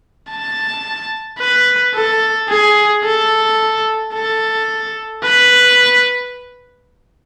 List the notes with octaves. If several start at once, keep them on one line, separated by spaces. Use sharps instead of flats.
A5
B4
A4
G#4
A4
A4
B4